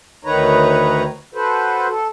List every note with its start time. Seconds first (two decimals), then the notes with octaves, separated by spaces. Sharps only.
0.25 D2 D#3 D#4 B4 C#5 A#5
1.34 F#4 A4 B4 C5
1.88 A4